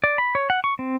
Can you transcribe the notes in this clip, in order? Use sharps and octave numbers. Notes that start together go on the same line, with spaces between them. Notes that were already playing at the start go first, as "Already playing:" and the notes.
D5
B5
C#5
F#5
C#6
C4